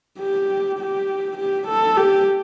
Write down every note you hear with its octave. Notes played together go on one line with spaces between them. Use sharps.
G4
G4
G4
A4
G4